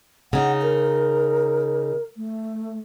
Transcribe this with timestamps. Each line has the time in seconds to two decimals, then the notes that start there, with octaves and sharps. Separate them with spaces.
0.33 C#3 D#4 F#5
0.62 A#4
2.17 A3